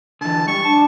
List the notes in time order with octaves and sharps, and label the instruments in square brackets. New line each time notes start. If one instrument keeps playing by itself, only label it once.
[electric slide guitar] D3 E3 [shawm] A5
[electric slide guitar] G3 [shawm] C#6
[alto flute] D4 [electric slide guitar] A5